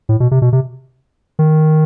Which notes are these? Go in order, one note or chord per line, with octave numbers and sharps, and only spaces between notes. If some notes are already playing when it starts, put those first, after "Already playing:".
A2
B2
C3
B2
C3
D#3